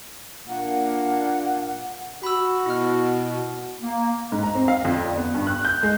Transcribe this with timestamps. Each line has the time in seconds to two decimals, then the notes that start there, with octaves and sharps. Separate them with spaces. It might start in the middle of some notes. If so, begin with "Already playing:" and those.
0.48 A#2 A#3 D4 F#5
2.23 F#4 B5 E6
2.66 B2 E4 F6
3.81 A#3
4.32 G#2
4.43 A#5
4.55 C4
4.68 F5
4.85 F2
5.05 D5
5.17 B3
5.35 G2
5.47 F#6
5.65 G6
5.83 G#3